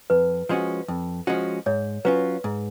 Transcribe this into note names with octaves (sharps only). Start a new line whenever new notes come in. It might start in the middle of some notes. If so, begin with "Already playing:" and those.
F2 B4
F3 G#3 C#4 F#4
F2
F3 G#3 C#4 F#4
G#2 C#5
F#3 C#4 F4 B4
G#2